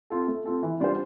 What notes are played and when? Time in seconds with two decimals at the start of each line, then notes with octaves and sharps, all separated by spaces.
0.10 C4 F4 A4
0.28 A3
0.46 C4 F4 A4
0.63 E3
0.80 G3 D4 F4 C5